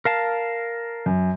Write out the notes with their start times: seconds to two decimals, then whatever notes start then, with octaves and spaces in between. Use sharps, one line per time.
0.05 A#4 F5 A5
1.06 F#2